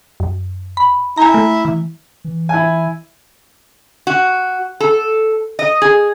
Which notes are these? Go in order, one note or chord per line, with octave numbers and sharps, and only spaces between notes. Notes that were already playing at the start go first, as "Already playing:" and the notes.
F#2
B5
E4 G#5 A#5
A3
E3
E3
E4 G#5
F#4
A4
D#5
G#4